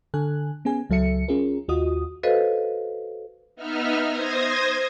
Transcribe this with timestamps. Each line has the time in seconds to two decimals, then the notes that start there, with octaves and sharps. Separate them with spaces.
0.14 D3 A4 G#5 F#6
0.65 B3 C#4 G#4 G#5
0.90 C#2 F#3 A4 E5 C#7
1.28 C#4 F4 G#4 A#4
1.68 D#2 F4 F#4 D#5 D#6
2.23 F#4 A4 B4 C5 D#5 F5
3.56 B3 D#4 E5 F6
4.07 C5 D#6 G#6 A#6